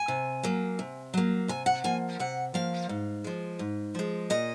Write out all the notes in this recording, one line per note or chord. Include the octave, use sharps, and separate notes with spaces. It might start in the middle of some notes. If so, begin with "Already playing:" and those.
Already playing: G#5
C3
F#3 A#3
C3
F#3 A#3
C3 G#5
F#5
F3 A#3 G#5
C3 F#5
F3 A#3 F5
G#2
F3 G#3
G#2
F3 G#3
A#2 D#5